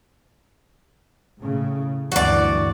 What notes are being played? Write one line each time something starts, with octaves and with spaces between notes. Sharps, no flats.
A2 C#3
D2 G2 E3 F#4 D5